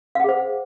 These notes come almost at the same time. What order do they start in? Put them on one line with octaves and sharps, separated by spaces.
F5 F#5 G#4 C5